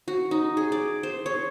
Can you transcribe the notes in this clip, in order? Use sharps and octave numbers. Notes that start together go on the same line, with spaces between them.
F#4
D#4
G#4
D5
C5
C#5